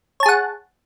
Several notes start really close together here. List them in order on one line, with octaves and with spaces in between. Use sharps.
C#5 A5 G#4 F#5